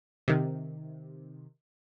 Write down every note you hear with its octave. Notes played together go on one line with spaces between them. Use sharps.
C3 D#3